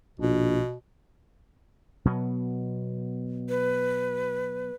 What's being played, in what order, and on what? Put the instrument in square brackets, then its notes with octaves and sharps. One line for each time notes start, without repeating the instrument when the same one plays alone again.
[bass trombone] A#1 [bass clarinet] B2
[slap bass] B2 F#3 B3
[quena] B4